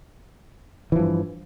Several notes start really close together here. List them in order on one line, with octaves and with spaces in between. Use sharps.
E3 F3 G2